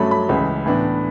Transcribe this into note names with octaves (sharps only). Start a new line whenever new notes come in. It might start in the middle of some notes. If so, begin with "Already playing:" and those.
Already playing: G2 F#3 A3 C#4 B5
B5
C#2 C#3 E3
A2 E3 B3 D4